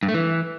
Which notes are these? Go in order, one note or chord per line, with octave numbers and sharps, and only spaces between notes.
G2
A3
E3